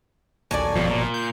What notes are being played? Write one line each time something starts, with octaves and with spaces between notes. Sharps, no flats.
A#1 D#2 F#3 A4 D5 G#5
G1 F2 B2 F3
A#2
G6